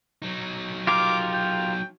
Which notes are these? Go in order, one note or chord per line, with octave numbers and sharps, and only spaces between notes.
F#3 D#4
F4 G4 A#4 D6
G5